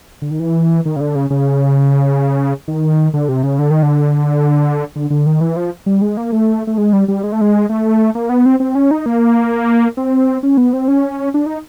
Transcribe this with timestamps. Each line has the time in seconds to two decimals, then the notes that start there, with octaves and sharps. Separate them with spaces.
0.22 D3
0.31 D#3
0.40 E3
0.85 D#3
0.96 C#3
1.01 D3
1.15 C#3
1.30 C#3
2.68 D#3
3.14 D3
3.29 C3
3.43 C#3
3.59 D3
3.71 D#3
3.83 D3
4.96 D3
5.10 D3
5.26 D#3
5.41 E3
5.56 F3
5.86 G3
6.02 G#3
6.17 A#3
6.32 A3
6.67 A3
6.78 G#3
6.93 G3
7.08 G3
7.23 G#3
7.32 A3
7.41 G#3
7.69 A3
8.15 A#3
8.29 B3
8.46 C4
8.60 C4
8.75 C#4
8.91 D#4
9.06 A#3
9.97 C4
10.43 C#4
10.57 B3
10.73 C4
10.88 C#4
11.34 D4
11.46 D#4